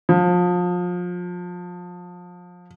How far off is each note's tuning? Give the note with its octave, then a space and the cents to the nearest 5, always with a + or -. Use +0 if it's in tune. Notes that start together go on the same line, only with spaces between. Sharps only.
F3 +30